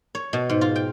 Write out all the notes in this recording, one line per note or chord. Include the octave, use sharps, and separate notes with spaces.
C#5
B2
G#2
F4
G5